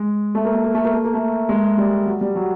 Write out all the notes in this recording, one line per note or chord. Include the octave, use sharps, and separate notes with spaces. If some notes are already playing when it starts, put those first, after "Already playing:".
Already playing: G#3
A3
A#3
A3
A#3
A3
A#3
A3
A#3
A3
G#3
G3
F#3
G3
F#3